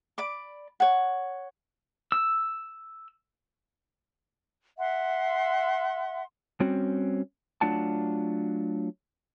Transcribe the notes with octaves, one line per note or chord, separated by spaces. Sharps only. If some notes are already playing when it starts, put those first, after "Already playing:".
D5 B5 D6
C#5 F#5
E6
E5 F#5 C6
G3 C4 C#4 F#4
F#3 A3 D4 F4 F#5 A5